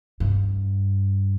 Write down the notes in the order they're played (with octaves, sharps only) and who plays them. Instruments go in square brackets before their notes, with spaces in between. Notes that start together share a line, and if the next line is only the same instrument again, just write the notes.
[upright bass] G2